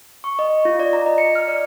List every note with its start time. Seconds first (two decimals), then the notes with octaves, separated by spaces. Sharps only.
0.24 C#6
0.39 D#5
0.65 F4
0.79 D5
0.93 A#5
1.06 D#5
1.18 C#7
1.35 F6
1.48 D5